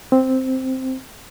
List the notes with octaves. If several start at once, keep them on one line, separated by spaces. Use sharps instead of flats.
C4